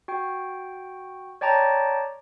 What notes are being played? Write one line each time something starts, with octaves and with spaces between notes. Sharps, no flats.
F#4 G5
C#5 D5 G5 A5 A#5